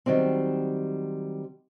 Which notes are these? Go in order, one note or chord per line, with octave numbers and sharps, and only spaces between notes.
D#3 F#3 G3 C4